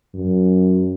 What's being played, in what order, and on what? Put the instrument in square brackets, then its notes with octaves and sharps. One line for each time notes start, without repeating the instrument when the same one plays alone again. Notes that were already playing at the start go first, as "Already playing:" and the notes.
[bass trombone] F#2